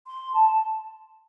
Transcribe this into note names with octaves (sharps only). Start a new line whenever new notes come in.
C6
A5